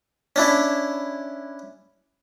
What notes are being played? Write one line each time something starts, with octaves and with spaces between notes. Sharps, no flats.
C#4 D4 E4